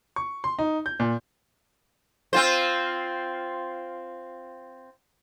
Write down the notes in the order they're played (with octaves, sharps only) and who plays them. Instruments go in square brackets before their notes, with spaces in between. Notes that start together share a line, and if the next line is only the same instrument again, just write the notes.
[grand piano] C#6
C6
D#4
G6
A#2
[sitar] C4 F4 C5